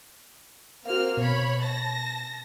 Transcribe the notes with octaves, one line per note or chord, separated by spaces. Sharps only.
A#3 C4 F#4 F5 F6
B2 C#5 B5
A5 A#6